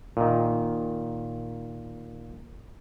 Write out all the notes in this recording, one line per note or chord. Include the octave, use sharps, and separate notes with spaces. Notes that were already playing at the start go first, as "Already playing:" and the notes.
A#2 D#3